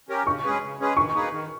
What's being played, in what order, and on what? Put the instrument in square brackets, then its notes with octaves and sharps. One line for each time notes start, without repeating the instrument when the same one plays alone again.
[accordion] C#4 G4 A#4
[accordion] C#3 [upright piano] C#6
[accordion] G#3 C#4 G#4 B4
C#3
G#3 C#4 G#4 B4
[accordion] D#3 [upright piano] C#6
[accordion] A#3 D#4 G#4 B4
D#3